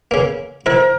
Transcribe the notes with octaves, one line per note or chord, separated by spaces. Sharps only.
C#3 A#3
E4 A4 A#4 C5